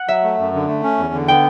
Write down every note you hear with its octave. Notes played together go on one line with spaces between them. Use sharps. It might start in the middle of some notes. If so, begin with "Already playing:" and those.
Already playing: F#5
F#3 E5
A3
F#2
D3
A3
C#4
E2
D3
B3 G5